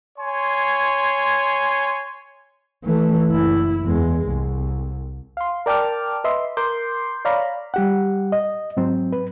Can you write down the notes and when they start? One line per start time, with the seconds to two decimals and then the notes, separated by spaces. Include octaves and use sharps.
0.17 C#5 G#5 C6
2.84 E3 A3
3.28 F#1 E4
3.84 E2 G#3
4.28 C2
5.37 F5 C6
5.66 A#4 D5 G5 A5 D6 F6
6.24 B4 D#5 E5 C6
6.57 A#4 C6 D6 G6 C7
7.25 C#5 D5 F5 A#5 B5
7.74 G3 G4 F#5
8.32 D#5
8.77 G#2 F#3 C4
9.13 B4